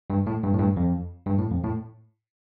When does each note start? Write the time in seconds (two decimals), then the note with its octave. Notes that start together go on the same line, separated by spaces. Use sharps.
0.10 G2
0.27 A2
0.43 G2
0.54 A2
0.59 G2
0.77 F2
1.26 G2
1.38 A2
1.50 F2
1.64 A2